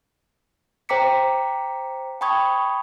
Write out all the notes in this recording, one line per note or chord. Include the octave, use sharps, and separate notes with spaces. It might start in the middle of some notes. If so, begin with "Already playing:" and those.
C5 G5 A#5 D6 B6 C#7
G5 A5 B5 C#6 D#6 G#6